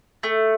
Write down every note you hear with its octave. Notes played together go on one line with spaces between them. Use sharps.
A3